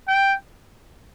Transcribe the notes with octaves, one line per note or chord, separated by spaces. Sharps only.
G5